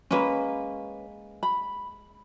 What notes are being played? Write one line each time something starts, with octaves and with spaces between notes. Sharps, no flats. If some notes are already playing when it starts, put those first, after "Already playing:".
G#3 A#3 C#4 B4
B5